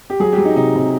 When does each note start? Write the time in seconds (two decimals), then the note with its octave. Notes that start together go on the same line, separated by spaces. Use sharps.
0.10 G4
0.20 F#3 G#4
0.33 G4
0.38 F#3
0.45 D#4
0.56 C3 D#4
0.75 C3